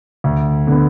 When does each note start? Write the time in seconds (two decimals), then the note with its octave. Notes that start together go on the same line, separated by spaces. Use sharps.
0.24 D2
0.67 D3 B3